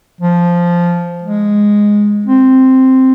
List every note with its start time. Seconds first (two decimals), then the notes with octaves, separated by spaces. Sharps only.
0.21 F3
1.24 G#3
2.27 C4